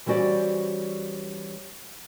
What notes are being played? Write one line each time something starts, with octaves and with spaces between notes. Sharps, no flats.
E3 G3 C#4 F#4 C5 D5